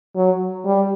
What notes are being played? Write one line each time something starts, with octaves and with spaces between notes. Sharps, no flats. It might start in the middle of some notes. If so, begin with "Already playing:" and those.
F#3
G3